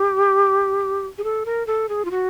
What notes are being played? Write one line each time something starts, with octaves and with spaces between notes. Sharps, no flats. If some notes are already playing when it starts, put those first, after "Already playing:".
Already playing: G4
G#4
A4
A#4
A4
G#4
F4
F#4